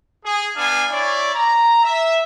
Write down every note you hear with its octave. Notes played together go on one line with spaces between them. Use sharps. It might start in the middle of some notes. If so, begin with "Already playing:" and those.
G#4
B3 D4 F5 G#5
E4 C#5 D5
A#5
E5